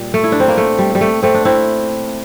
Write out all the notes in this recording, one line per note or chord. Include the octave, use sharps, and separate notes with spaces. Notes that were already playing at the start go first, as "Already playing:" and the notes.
Already playing: A#2 G3
A3
E4
D4
C4
A#3
A3
G3
G3
A3
A3 C4
D4
C4 E4